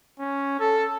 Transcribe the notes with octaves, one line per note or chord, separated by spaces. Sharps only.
C#4
A4